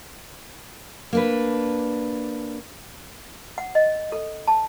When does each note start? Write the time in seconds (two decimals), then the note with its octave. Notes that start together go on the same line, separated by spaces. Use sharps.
1.13 A#3 D4 B4
3.58 F#5
3.75 D#5
4.12 A4
4.47 A5